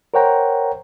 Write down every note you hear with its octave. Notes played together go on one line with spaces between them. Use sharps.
A#4 C5 C#5 F#5 G5 A#5